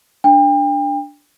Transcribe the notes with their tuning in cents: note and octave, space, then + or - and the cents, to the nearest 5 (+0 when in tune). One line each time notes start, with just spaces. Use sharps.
D4 -5 G5 +35